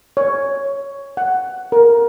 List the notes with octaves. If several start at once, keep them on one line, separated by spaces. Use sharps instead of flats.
C#5
F#5
A#4